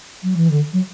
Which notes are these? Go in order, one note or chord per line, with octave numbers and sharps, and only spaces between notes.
F#3
E3
D3
F#3